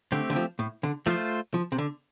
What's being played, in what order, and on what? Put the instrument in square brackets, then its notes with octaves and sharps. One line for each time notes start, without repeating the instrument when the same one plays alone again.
[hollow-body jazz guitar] D3 [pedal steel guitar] A3 C4 G4
[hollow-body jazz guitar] D3
F3
A2
D3
[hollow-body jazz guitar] F3 [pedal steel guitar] A3 F4 C5
[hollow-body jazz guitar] F3
C3
D3